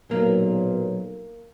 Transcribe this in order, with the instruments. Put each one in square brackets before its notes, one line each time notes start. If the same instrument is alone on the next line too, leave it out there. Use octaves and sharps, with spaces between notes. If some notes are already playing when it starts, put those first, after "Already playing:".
[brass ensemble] B1 A#2 [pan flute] F#3 [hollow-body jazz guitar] A#3